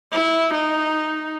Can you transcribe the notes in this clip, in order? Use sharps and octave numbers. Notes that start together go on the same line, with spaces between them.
E4
D#4